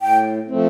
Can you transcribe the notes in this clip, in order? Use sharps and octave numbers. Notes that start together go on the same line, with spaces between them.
A2 G5
F3 A3 C4